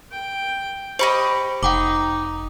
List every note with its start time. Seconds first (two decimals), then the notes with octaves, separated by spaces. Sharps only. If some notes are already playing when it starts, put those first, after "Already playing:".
0.11 G5
0.99 G4 C5 D#5 B5 C#6
1.63 F1 D#4 F#5 G5 D6